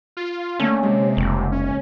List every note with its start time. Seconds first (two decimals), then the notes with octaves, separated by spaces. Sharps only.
0.17 F4
0.59 D3 A3 A#3 C#4
0.83 C3 G#3
1.17 F1 C#3
1.52 C#4